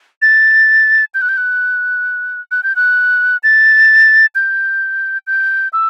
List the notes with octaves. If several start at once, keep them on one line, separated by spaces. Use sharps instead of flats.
A6
G6
F#6
G6
F#6
F#6
G6
F#6
A6
G6
G6
E6